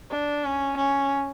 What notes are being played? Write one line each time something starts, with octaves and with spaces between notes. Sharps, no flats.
D4
C#4
C#4